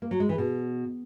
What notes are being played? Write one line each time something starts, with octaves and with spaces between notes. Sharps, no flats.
A#3
F#3
G#3
E3
B2